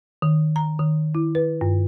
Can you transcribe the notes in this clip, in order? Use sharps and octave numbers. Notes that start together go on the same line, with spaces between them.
D#3
A#5
D#3
E4
B4
G2